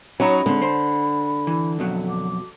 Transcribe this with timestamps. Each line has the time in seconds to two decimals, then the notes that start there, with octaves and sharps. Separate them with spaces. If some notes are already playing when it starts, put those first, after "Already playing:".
0.20 F#3 C#4 D#4 C#5 A#5 B5
0.46 D3 G#3 C4
0.62 C5
1.47 E3
1.79 F2 B2 F#3
2.09 D6